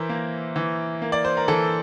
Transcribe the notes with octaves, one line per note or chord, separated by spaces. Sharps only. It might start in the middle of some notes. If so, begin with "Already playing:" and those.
Already playing: E3 A#4 C5 E5
A#3
E3
A#3
D5
C5
A#4
E3 A4